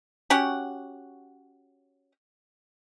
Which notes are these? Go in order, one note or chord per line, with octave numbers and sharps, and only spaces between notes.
C#4 F#4 G4 F#5